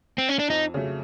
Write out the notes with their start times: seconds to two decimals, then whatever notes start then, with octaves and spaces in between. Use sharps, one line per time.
0.18 C4
0.29 C#4
0.39 D4
0.50 F2 D#4
0.74 C#3 F#3 A3